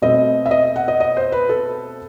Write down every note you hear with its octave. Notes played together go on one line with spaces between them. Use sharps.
B2 A3 C4 D#5
E5
D#5
F#5
D#5
D#5
C5
B4
A4